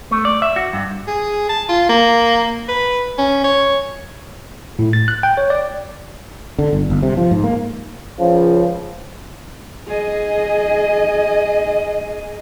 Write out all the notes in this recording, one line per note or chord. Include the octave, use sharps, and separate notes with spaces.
A3
D5
E5
F#4
G2
G#4
A5
F4
A#3
B4
C#4
C#5
A2
A6
F#6
G5
C#5
D5
D3
G1
G1
C3
F3
G#2
A#3
C#2 C#3 F3
G#4 D#5